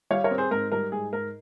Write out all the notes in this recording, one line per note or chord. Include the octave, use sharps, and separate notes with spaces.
G3 C#5 F5
A#4 C#5
C4
G#4 C5
G#2 A#4
G3 A#4
G#2 G#4
G#2 A#4